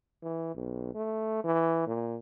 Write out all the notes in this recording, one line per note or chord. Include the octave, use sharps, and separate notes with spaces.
E3
B1
A3
E3
A#2